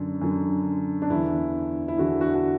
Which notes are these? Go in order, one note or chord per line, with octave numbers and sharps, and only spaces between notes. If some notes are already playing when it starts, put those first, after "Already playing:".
Already playing: F#2 D3
F#2 D3
D4
E2 D3 E4
E4
E2 D3 F#4
F#4
F#4